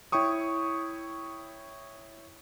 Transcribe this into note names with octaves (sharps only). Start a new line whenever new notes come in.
E4 C#5 G5 C#6 D#6